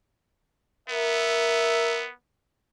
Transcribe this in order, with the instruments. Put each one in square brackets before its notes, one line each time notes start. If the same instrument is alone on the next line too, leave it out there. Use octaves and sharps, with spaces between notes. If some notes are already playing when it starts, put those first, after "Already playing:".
[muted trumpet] B3 [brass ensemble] A#4 E5